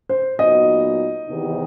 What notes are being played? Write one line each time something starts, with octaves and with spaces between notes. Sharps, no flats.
C5
A#2 F#3 B3 D#4 F#4 D#5
E2 C3 D#3